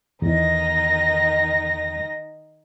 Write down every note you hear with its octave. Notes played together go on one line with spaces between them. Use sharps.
E2 D#3 D#4 A#6